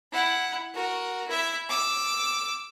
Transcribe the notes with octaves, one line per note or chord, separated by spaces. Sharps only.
E4 F#5
F#4 A#4
E4 E5
D6 E6